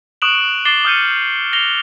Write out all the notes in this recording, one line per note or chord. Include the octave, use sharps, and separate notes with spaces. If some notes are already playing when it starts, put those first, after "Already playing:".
C#6 D#6 F#6 D7 E7 F#7
D6 A6 C7 E7 G7
D#6 F6 G6 C#7 D#7
A#6 C7 F7 G7